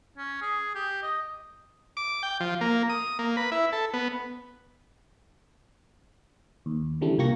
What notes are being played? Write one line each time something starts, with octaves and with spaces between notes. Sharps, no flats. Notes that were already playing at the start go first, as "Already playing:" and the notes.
C#4
G#4
G4
D#5
D6
G5
F3
A#3
D#6
A#3
B4
E4
A4
B3
D#2
C#3 E3 G3 A3 C4 D4
C2 A#2 A#3 G4 C#6 A#6